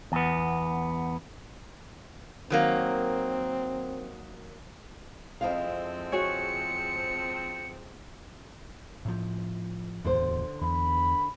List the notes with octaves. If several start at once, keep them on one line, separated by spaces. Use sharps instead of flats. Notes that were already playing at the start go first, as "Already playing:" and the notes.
E2 B3
D#3 F#3 A#3 C4
F2 F3 G#3 C4 E4 F5
F#4 G#4 C#5 C#7
A2 F3
D1 E2 D3 C5
E2 B5